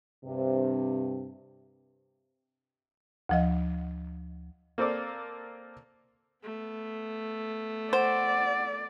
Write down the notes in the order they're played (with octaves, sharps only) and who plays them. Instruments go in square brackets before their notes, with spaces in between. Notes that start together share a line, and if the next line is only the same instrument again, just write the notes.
[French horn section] G2 C3
[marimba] D2 F3 D#5
[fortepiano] A#3 C4 A4 D5
[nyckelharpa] A3 B3
[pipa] C5 [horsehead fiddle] D5 [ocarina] F#5